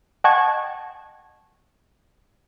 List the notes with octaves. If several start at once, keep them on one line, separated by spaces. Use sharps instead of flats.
D#5 F#5 G5 A5 C#6 G#6